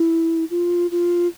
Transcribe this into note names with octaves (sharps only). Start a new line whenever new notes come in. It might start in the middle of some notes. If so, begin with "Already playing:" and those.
Already playing: E4
F4
F4